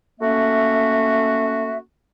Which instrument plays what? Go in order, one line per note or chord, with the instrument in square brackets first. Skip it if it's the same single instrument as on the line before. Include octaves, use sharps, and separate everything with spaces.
[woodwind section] A3 A#3 C#4 F#4 E5